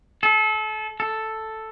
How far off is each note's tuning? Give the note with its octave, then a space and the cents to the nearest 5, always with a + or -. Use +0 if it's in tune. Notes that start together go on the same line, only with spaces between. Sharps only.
A4 -30
A4 +0